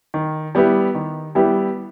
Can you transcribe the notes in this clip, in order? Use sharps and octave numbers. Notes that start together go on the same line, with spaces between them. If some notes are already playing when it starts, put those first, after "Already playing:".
D#3
G3 B3 E4 G4
D#3
G3 B3 E4 G4